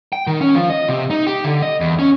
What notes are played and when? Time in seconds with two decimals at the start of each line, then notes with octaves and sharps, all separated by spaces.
0.13 G5
0.27 D#3
0.41 C#4
0.55 F3
0.70 D#5
0.89 C3
1.10 D#4
1.27 G4
1.44 D3
1.62 D#5
1.81 E2
1.99 C#4